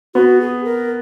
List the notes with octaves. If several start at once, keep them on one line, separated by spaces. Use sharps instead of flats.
B3 F#4
G#4
A#4